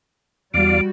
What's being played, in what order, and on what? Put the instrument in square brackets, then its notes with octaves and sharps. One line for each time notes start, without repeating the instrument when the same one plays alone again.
[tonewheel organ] E2 D5 F5 [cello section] G3 F#4 [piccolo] D7